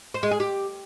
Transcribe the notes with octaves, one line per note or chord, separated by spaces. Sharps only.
C5
G#3
G#4
G4